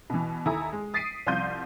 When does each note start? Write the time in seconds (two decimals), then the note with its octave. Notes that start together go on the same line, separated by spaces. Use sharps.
0.10 B2 E3
0.45 D#2 E4 A4 G#5 A#5 D#6
0.72 G#3
0.94 D#6 A6 B6 C7 D7 D#7
1.27 C2 F3 F4 C6 G6 D#7